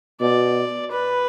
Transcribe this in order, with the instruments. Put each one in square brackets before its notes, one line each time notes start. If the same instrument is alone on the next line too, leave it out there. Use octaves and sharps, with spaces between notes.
[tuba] B2 [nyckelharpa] D5
[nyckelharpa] B4